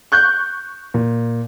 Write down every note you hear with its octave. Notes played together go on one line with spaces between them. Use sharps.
C#6 F#6 G6
A#2